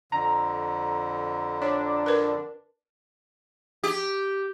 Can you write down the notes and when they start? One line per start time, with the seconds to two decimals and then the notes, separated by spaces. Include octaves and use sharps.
0.12 F2 D3 A#5
1.62 D4 C#5
2.06 A#4 B4
3.84 G4